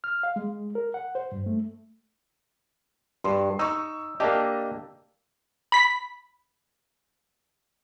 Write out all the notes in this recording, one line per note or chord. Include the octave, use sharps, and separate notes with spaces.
F6
F5
G#3
A#4
F#5
C5
G2
A3
G2 C6
D#4 C#6 E6
A#3 D4 G4 D#5 A5
B5 B6